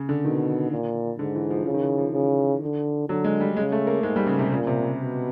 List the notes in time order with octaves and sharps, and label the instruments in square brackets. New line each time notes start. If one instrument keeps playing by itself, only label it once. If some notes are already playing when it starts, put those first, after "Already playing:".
Already playing: [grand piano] C#3
D3
[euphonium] B2 [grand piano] D#3
[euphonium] A#2
[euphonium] G#2 [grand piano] D3
[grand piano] E3
F3
[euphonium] C#3 [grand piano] F3
[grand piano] D#3
E3
F3
[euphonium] C#3 [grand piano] F3
[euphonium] D3
[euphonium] D3 [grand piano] F#3
[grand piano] G#3
G3
[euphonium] C#3 [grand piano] G#3
[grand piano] A3
A#3
[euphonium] G#2 [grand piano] G#3
[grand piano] G3
C#3
C3
[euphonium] A#2 [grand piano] C#3
[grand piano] C3
C#3
[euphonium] B2